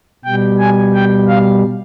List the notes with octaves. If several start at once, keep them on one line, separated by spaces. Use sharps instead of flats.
B2 G3 G5
G#5
G5
F5